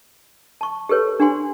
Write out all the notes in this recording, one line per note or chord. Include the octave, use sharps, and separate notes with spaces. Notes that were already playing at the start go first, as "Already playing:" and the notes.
A5 C#6
G4 A4 B4 C#5
D4 G4 F#5 G#5 C6